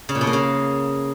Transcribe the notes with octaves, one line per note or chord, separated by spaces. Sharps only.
C#3
A#2
B2
A#3
C#3